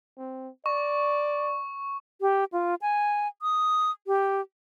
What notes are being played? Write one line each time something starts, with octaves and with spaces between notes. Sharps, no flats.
C4
D5 C#6
G4
F4
G#5
D#6
G4